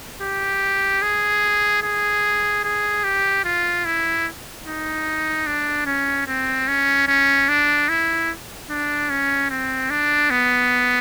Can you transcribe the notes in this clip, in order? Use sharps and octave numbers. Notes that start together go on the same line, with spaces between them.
G4
G#4
G#4
G#4
G4
F4
E4
D#4
D4
C#4
C4
C#4
C#4
D4
E4
D4
C#4
C4
D4
B3